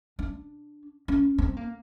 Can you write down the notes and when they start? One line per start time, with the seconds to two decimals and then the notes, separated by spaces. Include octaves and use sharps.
0.19 D4
1.08 C#4
1.38 C4
1.57 A#3